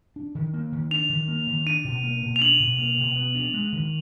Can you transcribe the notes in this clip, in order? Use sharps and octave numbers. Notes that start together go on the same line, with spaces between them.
D4
D#3
A#3
D#3
D4 F7
D#3
A#3
D#3
D4 D#7
B2
A#3
B2
F7
D4 F#7
B2
A#3
B2
B3
D4
G#3
D#3